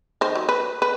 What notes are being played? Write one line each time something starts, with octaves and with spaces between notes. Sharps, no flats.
D#3 C5
F#3
B4
B4